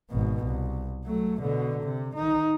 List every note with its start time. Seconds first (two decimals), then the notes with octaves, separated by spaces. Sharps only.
0.10 G#1 B2
0.45 C2
1.05 F#3 A3
1.41 B2 D3
1.83 C3
2.16 D#3 D#4